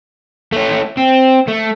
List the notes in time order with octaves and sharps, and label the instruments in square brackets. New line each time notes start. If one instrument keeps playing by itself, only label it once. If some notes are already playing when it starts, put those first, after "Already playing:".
[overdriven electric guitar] A3 C#4
C4
A3